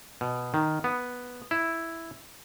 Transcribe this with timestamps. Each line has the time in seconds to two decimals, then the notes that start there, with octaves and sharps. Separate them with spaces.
0.21 B2
0.54 D#3
0.84 B3
1.51 E4